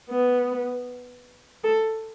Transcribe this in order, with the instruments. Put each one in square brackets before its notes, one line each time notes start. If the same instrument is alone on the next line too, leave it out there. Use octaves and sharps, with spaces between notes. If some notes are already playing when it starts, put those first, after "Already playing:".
[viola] B3
A4